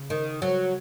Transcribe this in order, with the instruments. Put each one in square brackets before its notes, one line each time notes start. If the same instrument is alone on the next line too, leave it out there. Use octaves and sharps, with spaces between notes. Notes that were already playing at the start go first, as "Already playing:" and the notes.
Already playing: [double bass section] C#3
[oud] D#3
F#3